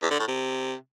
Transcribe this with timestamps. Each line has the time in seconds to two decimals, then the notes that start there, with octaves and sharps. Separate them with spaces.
0.02 E2
0.11 D3
0.19 A2
0.28 C3